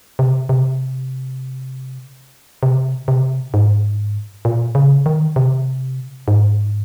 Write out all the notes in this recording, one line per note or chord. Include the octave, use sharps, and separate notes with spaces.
C3
C3
C3
C3
G#2
A#2
C#3
D#3
C3
G#2